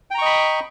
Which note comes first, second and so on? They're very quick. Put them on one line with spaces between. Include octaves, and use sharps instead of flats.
G5 A#5 C#6 D#5 B5